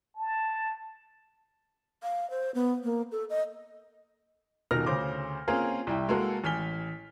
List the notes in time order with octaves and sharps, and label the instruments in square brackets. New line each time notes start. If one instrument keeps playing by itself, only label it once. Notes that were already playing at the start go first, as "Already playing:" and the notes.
[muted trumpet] A5
[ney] F5
C5
B3
A#3
A4
D#5
[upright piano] D#1 B2 D#4 A#4 F6 A#6
D2 C#3 C5 D6
A#3 C4 C#4 F4 G#4 A#4
C2 E4 G5
G#3 A#3 F#4 A4 A#4
A1 G#5 F6 B6 G7